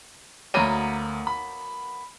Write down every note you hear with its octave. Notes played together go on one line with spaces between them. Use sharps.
D2 F#3 A#3 B3 D#7
B5